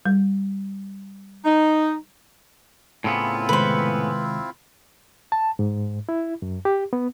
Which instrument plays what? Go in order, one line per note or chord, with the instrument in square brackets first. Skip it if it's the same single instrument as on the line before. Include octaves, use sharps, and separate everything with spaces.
[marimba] G3
[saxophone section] D#4
[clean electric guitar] A2 C#3 B3 [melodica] C4 E4 F4
[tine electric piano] C3 D#3 G#3 [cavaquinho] B4 C5
[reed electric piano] A5
G#2
E4
F#2
G4
B3